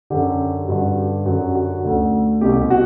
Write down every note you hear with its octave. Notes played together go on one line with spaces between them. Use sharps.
F#2 D3 G4
G2 D3 F#4
G4
F#2 D3 F#4
F#4
D2 D3
C2 B2 G4
F#4